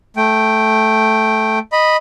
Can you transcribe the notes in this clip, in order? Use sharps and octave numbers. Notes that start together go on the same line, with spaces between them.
A3 G5
D#5 B5